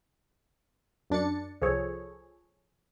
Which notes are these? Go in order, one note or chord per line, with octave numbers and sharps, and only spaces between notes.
F#2 D4 A6 C#7
C2 F3 G#4 A4 C#5